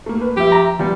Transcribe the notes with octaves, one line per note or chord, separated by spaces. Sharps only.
A3 A#3
B4
F3 G4 E5
A#5
E3 F3 G3 B3 F4